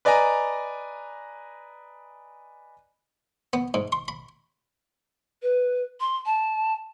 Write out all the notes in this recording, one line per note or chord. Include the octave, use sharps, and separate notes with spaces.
B4 D5 D#5 G#5 A#5
B3
G#2
C6
B5
B4
C6
A5